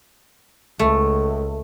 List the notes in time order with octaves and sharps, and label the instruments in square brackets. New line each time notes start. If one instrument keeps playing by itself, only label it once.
[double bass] C#2 [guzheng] A3